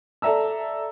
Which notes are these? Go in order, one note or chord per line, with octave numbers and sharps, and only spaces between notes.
A4 D5 E5 A#5 E6